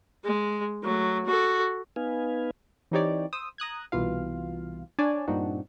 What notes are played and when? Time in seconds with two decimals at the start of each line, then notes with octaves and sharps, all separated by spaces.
0.24 G#3
0.83 F#3 A3
1.25 F#4 A4
1.96 B3 D#4 B4 F5 G#5
2.91 E3 C4 D#4 G4 C#5 D5
3.33 C5 D#6 E6
3.58 A#5 D#6 F#6 G#6
3.92 C2 B2 E3 F4 F5
4.99 D4 C#5 D5 G#5 A5
5.28 G2 A#2 C4 D4 D#4 F#4